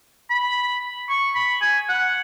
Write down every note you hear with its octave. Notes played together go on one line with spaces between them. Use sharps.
B5
C#6
B5
G#5
F#5